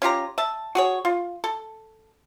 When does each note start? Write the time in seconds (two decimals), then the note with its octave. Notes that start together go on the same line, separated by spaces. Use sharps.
0.02 C#4 F4 G4 A#5
0.38 E5 A5
0.75 F#4 G#4 C#5
1.05 F4
1.44 A4